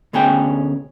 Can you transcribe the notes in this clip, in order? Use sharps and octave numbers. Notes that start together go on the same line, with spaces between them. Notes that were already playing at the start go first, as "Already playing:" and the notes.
D2 B2 C#4 G#4 G5